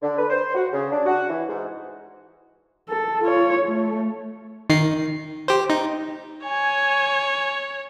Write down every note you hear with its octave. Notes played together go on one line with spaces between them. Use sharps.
D3
B4
C5
F#4
C#3
D4
F#4
E3
G#2
A4
F4 C#5
A3
D#3 D#4 C7
G4 C5
D#4
C#5 G#5